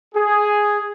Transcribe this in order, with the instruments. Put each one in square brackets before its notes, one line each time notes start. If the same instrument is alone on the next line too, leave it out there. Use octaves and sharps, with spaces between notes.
[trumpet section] G#4